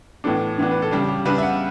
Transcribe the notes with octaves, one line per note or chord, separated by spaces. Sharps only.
A2 E3 B3 D4 A4
A2 E3 B3 D4
B4
A4
C#3 G3 D4 G4
G4
C#3 G3 D4 B4
E5
F#5